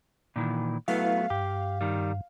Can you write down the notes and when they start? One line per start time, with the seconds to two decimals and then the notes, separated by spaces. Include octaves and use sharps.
0.36 A#2 D#3 E3
0.88 F#3 A3 B3 E4 B4 F5
1.30 G2 G4
1.81 D#3 G3